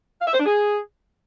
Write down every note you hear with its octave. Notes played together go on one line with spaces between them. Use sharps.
F5
E5
C5
D4
G#4